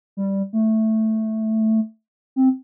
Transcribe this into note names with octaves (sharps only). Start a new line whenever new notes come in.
G3
A3
C4